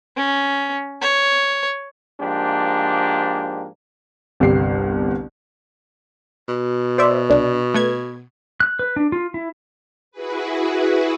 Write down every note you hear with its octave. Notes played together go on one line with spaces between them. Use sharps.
C#4
C#5
G#2 F3 A#3 D4 G4
G1 C2 B3 G4 C7
B2
C5 D5 E5
C2 D4
A3 B3 G#6
F#6
B4
D4
F4
E4
E4 F#4 G#4 B4